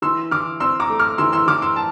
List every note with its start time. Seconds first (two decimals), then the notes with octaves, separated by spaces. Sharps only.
0.02 E3 C6 E6
0.31 E3 D6 F6
0.60 C4 C6 E6
0.80 A#5 D6
0.90 A3
0.99 D6 F6
1.18 E3 C6 E6
1.33 C6 E6
1.47 E3 D6 F6
1.62 C6 E6
1.76 A5